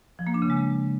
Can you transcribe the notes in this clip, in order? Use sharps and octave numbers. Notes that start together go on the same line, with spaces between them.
F3
A#3
D4
C#3
G#3